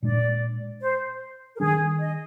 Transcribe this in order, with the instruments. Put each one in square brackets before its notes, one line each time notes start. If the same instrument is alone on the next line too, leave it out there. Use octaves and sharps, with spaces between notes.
[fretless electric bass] A#2 G#3 D4 [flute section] D5
[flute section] C5
A#4
[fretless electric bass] D#3 G3 D4 [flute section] G#4
[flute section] D#5